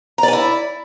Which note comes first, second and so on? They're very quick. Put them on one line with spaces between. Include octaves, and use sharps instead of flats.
A#5 D5 G#5 E4